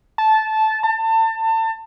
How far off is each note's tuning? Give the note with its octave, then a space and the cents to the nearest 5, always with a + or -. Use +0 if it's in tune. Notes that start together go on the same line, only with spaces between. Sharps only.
A5 -15
A5 +30